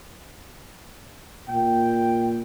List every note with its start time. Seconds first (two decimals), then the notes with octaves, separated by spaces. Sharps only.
1.49 A#2 G5